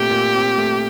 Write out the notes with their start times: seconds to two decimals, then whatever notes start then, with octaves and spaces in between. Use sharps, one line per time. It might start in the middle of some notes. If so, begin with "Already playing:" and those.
Already playing: A#2 A3 C4 G4
0.11 A#2
0.35 C4
0.58 A3